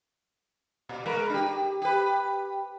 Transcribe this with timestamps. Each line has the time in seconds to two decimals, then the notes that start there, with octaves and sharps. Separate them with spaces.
0.89 A#2
1.06 G#3 A#4 B4
1.30 D4 G4
1.46 G4
1.82 G4 B4